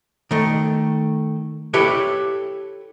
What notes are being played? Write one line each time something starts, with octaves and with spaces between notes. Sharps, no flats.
D#3 A3
E4 G4 A4 B4 C#5